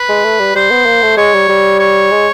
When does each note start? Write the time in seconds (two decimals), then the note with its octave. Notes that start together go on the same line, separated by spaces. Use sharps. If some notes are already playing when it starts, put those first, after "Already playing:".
Already playing: B4
0.09 G#3
0.24 A3
0.40 G3
0.55 G3 C5
0.70 B3
0.86 A#3
1.02 A3
1.17 G#3 C#5
1.34 G3
1.49 G3
1.79 C#5
2.11 G#3